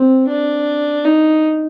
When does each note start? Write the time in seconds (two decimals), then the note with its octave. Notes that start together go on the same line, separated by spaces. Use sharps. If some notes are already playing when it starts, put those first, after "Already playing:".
Already playing: C4
0.27 D4
1.05 D#4